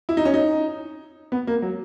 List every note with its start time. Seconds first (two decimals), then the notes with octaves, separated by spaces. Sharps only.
0.09 E4
0.17 D#4
0.25 C#4
0.34 D#4
1.32 B3
1.47 A#3
1.62 F#3